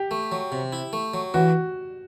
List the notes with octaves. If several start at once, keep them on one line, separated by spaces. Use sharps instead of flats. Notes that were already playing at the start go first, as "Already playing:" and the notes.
Already playing: G4
A3
F#3
C3
E4
A3
F#3
E3 F#4